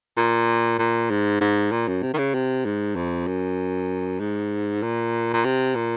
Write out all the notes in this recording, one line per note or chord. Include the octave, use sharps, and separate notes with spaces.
A#2
A#2
G#2
G#2
A#2
F#2
C3
D#3
C#3
C3
G#2
F2
F#2
G#2
A#2
A#2
C3
A#2